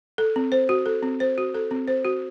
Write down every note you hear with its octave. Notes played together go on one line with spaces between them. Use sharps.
A4
C4
C5
F#4
A4
C4
C5
F#4
A4
C4
C5
F#4